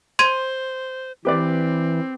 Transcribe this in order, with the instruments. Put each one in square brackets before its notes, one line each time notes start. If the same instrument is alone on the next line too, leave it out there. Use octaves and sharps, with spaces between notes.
[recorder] C5 [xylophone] C6 G#6 D#7
[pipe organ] E3 [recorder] C4 [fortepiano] G4 B4 D5